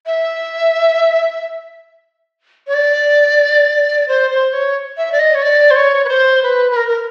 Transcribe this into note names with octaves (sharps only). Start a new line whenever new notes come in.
E5
C#5
D5
C5
C5
C#5
E5
D5
D#5
C#5
D5
C5
C#5
B4
C5
B4
B4
A#4
A#4